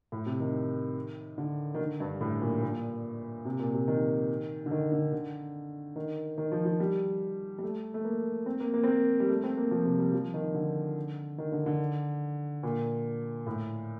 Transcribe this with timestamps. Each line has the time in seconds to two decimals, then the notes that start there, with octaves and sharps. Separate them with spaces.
0.12 A2
0.26 C3
0.40 D#3
1.38 D3
1.74 D#3
1.79 D3
2.00 G2
2.21 A2
2.42 A#2
2.63 A#2
3.45 C3
3.59 A#2
3.74 C3
3.88 D#3
4.66 D3
4.71 D#3
4.92 D3
5.13 D3
5.96 D#3
6.38 D#3
6.52 F3
6.65 F3
6.80 G3
7.58 G3
7.63 A3
7.94 A3
8.05 A#3
8.46 C4
8.60 A#3
8.74 A#3
8.84 C4
8.88 A#3
9.20 G3
9.29 A3
9.44 C4
9.57 A#3
9.71 F3
9.85 C3
9.99 G3
10.13 F3
10.34 D#3
10.54 D3
11.38 D#3
11.52 D3
11.66 D3
12.63 A#2
13.47 A2